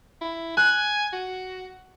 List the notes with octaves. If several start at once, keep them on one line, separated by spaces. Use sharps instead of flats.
E4
G#5 F#6
F#4